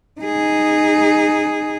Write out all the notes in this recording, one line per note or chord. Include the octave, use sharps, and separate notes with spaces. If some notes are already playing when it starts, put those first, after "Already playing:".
D#4 G#4